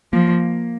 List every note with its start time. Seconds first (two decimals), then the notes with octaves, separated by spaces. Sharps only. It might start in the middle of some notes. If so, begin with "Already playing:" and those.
0.13 F3 A#3